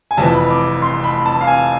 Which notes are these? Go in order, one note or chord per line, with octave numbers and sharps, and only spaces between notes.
G#5
F1 F2 E3 A5
B5
D6
C6
B5
A5
F5
G#5